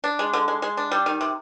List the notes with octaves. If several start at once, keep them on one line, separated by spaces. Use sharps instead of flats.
D4
G#3
D3
G#3
G#3
D4
G3
D#3
C3